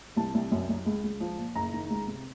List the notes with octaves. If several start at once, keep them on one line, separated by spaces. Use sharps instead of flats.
C2 A5
C2
F#2
F#2
C#2
C#2
F3
A#2
F#1 A#5
D#3
C#2
C3